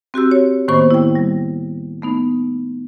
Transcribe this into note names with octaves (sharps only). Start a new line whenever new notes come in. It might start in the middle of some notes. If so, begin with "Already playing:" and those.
C4 F#4 G4 E6
C#5
A2 D#3 A#3 B3 C5 C#6
E4 G5
G3
A3 B3 D#4